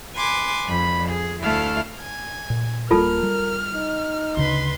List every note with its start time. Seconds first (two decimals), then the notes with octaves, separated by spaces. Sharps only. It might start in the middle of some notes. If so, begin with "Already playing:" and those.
0.17 B4 G#5 C6 D6
0.68 F2 B5
1.10 G#4
1.43 D2 A3 E4 F5 A5 F6
2.01 G#5
2.50 A#2
2.91 D1 G3 A#3 F4 A4 A#4 A5 F6
3.23 G3
3.74 D#4
4.37 D2 C#3 B4 C6